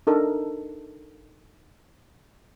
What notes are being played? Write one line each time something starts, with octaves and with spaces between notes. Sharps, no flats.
D4 D#4 A4 A#4